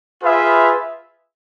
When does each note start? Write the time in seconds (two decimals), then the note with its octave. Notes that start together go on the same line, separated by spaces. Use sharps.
0.23 F4 G#4 B4 E5